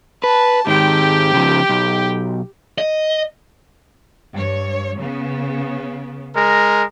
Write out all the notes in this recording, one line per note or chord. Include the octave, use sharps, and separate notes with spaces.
B4 A5
G#2 D#3 G4 G5
C#3 F3
B1
D#5
G2 C#5
C#3 B3
G#3 A#4